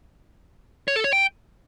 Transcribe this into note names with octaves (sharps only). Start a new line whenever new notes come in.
C#5
A4
C#5
G5